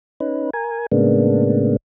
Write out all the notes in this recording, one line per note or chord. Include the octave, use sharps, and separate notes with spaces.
C#4 D#4 B4
A#4 G#5
A2 C#3 G#3 A#3 B3 D4